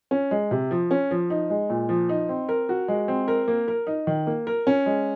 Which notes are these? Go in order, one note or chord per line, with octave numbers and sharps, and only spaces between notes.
C#4
G#3
C3
F3
C#4
F3
D#4
G#3
A#2
F3
D#4
C4
A#4
F#4
G#3
C4
A#4
A#3
A#4
D#4
D#3
A#3
A#4
C#4
G#3